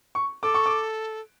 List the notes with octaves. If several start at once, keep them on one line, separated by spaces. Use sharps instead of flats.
C#6
A4 D6
C#6
D6